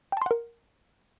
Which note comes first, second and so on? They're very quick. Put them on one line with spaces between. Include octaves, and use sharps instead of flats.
G5 A5 C6 F#5 A#4